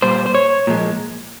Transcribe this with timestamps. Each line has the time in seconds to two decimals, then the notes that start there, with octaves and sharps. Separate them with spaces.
0.02 A#2 G3 C5
0.26 C5
0.35 C#5
0.67 A#2 F3 G#3